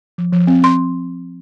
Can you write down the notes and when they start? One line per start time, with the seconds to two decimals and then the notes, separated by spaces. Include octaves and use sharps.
0.18 F3
0.33 F3
0.47 C4
0.62 C4 C6